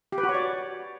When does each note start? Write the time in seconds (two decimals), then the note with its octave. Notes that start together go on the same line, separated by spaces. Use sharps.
0.12 G4
0.18 B4
0.23 F#4
0.29 C#5
0.34 D5